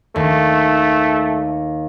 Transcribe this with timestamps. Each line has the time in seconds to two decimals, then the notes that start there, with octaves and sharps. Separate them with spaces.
0.16 D#2 A3